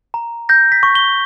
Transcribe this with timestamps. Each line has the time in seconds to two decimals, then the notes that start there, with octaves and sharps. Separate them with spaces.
0.14 A#5
0.49 G6 A#6
0.72 B6
0.83 C#6
0.95 G7